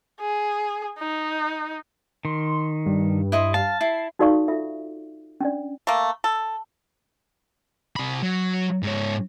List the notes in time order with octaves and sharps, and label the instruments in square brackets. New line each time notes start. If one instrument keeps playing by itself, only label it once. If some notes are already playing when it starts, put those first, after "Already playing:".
[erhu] G#4
D#4
[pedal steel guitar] D#3 [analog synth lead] C6
[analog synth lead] G2
[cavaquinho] E4 D#5 C6
[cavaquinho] F5 [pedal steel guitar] A5
[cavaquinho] E4 [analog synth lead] C7
[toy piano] D#4 F#4 A4 D5 F5 C#6
F4 A4 E5
C#4 D4 D5
[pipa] A3 A#3
A4
[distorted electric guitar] C3 B5
F#3
G#2 C#5